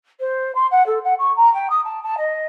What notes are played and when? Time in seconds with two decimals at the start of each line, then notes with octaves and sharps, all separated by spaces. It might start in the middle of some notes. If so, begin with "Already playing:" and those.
0.19 C5
0.54 C6
0.71 F#5
0.86 A4
1.04 F#5
1.18 C#6
1.36 A#5
1.54 G5
1.69 D#6
1.84 A5
2.03 A5
2.17 D#5